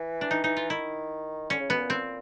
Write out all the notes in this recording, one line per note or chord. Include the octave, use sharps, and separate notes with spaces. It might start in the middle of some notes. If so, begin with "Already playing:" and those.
Already playing: E3
D4
D#4
D#4
F4
D#3 E4
D3 C#4
C#3
B2 B3
A#2
C4